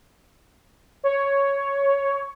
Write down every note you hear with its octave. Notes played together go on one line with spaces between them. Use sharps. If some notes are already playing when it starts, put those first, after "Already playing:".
C#5